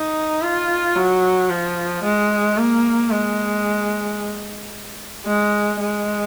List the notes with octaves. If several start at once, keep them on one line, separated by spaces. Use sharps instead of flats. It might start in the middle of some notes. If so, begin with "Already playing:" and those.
Already playing: D#4
F4
F#3
F3
G#3
A#3
G#3
G#3
G#3